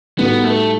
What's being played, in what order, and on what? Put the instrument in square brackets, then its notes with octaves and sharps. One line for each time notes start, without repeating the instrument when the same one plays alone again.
[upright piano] A2 G3 D#4 F#4 A4 [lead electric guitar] B3
[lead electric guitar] A3